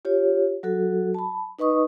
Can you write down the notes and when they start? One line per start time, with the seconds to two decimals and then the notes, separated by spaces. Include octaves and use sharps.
0.05 F4 G4 C#5
0.63 F#3 F#4 A4
1.14 A5 B5
1.59 D#4 B4 D#5 C#6 D#6